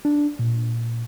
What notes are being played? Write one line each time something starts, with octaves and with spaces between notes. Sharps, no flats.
D4
A#2